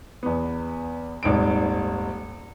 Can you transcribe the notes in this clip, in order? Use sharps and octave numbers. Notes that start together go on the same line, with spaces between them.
E2 B3
D#1 G#1 D#4 D7